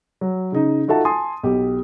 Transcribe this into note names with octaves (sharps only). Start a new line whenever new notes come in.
F#3
C#3 D#4
D#4 F4 F#4 A4 E5 A5
G#5 A5 C6 D#6
B1 G4